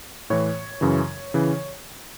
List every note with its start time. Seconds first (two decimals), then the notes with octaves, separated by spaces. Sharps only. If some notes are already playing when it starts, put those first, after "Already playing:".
0.30 A2 E3 C#5
0.81 F#2 C#3 E3
1.34 C#3 E3